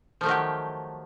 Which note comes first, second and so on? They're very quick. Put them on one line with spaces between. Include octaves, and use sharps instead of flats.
F3 A3 D#3 F#3 G4